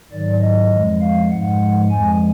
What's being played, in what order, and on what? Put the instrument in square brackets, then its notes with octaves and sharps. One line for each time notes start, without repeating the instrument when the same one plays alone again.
[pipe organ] G#2 D#3 F#3 D5
D#5
F2 F3 G#3
F5
G#2 F3 G#3 F#5
F2 F3 G#3 G#5